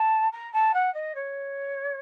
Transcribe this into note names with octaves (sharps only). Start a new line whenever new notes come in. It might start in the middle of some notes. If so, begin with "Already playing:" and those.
Already playing: A5
A#5
A5
F#5
D#5
C#5